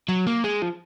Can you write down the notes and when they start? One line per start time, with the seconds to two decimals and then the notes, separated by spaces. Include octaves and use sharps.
0.09 F#3
0.27 A#3
0.44 G#3
0.62 F3